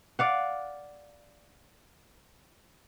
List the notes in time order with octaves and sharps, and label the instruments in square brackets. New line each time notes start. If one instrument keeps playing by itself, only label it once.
[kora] D5 F5 F#5